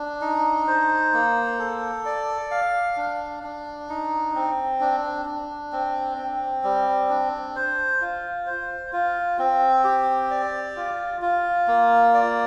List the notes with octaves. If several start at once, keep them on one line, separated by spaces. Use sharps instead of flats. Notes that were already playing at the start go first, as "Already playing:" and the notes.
Already playing: D4
D#4
C5
A#3
A4
D5
F5
D4
D4
D#4
C4
D4
D4
C4
C4
G3
D4
C5
F4
C5
F4
C4
G4
D5
F4
F4
A#3
D5